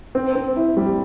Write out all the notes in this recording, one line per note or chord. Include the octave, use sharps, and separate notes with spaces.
C4
C4
E4
G3